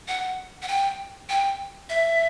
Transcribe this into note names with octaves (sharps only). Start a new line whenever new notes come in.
F#5
F#5
G5
G5
E5